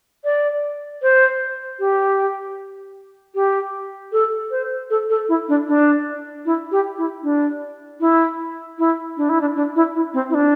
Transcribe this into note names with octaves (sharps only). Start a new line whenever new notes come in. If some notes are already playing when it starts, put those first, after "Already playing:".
D5
C5
G4
G4
A4
C5
A4
A4
E4
D4
D4
E4
G4
E4
D4
E4
E4
D4
E4
D4
D4
E4
E4
C4
E4
D4